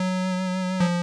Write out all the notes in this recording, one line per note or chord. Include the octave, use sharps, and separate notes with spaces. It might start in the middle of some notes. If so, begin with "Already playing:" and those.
Already playing: F#3
F3